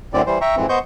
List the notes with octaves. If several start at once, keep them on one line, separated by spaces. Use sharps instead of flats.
F#2 A2 D3 C4 D5
E3 G3 C5
E5 G5 A#5 C#6
F2 G#2 E3 C4
B3 C5 D#5 C#6 G6